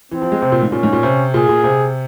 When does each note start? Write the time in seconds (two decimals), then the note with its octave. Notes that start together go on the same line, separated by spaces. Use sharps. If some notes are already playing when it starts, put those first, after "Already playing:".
0.11 E3 C4
0.22 F3
0.32 G#3
0.42 C3
0.52 A#2
0.62 G#2
0.72 A#2 C#4
0.83 G#2
0.93 A#2
1.03 C3
1.34 A#2 G#4
1.49 A#2
1.64 C3